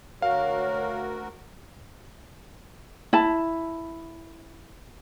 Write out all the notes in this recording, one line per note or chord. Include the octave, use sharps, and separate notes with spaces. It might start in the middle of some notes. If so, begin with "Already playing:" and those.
D2 F#4 A#4 C#5 F5
E4 A5